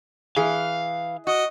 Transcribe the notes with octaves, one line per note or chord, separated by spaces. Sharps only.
E3 G#4 F5
F#4 D#5